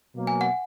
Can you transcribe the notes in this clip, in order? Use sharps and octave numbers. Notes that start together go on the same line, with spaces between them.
B2 F#3 A#3
G#5
F#5